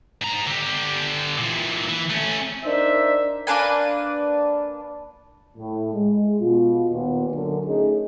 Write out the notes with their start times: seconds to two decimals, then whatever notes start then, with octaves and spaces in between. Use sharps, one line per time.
0.21 G#2 A#5
0.47 D3 G4
1.38 A#2 E3
1.89 E3
2.10 A3 C#4
2.64 D4 D#4 A#4 C5 E5
3.47 A#3 D4 B4 G#5
5.58 A2
5.94 G#3
6.40 B2 F4
6.91 D#2 A#2 B3
7.32 F#2 D3 A#4
7.65 A3 C#4 D#4 G#4